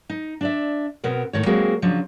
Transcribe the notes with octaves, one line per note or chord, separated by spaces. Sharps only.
D#4
D4 D5 E5
B2 B3 C4 A#4
D2 A2 D#3 C#5
F#3 G#3 A#3 C4 F#4 G#4
C#3 F3 F#3 D4